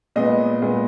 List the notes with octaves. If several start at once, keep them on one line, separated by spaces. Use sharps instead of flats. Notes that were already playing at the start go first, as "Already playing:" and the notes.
A#2 G#3 B3 D#5
A#2 G#3 B3